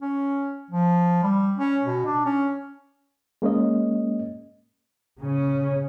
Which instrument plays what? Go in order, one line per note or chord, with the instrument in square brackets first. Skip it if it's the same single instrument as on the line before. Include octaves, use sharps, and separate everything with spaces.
[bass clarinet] C#4
F3
G3
C#4
B2
D4
C#4
[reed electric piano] G#3 A#3 C#4 D#5
[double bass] C#3 C#4